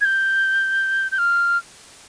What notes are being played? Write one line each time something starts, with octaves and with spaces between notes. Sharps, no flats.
G#6
G6
G6
F6